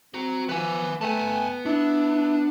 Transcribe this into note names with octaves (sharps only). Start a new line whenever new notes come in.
C4 F#4 A#5
F3 B3 B4 G#5
A3 B3 G#5 A5
D4 E4